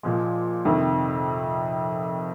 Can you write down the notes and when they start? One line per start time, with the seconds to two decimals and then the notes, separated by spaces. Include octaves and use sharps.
0.03 A#2 F3 G#3
0.65 F2 C3 D#3